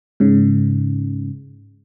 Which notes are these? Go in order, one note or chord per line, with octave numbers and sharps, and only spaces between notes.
G#2 C#3